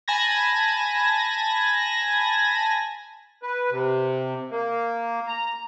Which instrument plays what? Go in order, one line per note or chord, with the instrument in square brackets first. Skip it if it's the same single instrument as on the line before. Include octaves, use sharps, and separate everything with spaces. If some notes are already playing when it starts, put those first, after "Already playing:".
[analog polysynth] G#5 A5 B5 G#6 A#6
[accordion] B4
C3
A#3
A#5